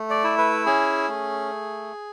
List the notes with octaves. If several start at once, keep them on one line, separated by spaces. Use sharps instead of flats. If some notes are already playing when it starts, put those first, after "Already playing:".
Already playing: A3
D5
E4
B4
C#4 G#4
A3